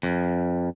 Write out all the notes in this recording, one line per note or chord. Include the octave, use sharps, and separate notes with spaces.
F2